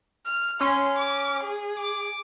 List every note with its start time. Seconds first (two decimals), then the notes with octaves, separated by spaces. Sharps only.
0.25 F6
0.60 C#4 C6
0.98 D6
1.43 G#4
1.77 D6